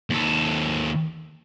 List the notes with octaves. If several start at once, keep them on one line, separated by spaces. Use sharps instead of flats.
D#2 A4